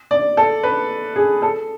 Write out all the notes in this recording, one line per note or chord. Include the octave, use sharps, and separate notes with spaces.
D5
A4
B4
G#4
A4